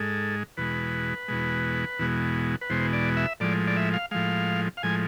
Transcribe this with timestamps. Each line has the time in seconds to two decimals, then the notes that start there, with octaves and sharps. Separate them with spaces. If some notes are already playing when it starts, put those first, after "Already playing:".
Already playing: G#2 G#3 A4
0.57 E2 B2 G#3 B4
1.28 E2 B2 G#3
1.99 E2 B2 G#3
2.61 B4
2.70 E2 B2 G#3 C5
2.93 D5
3.17 E5
3.40 A2 F3 G#3 D5
3.67 D5
3.77 E5
3.93 F5
4.11 A2 F3 G#3 F5
4.77 F5
4.83 A2 F3 G#3 G#5